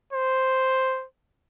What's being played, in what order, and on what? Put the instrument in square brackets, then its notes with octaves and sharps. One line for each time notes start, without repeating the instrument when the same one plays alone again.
[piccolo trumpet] C5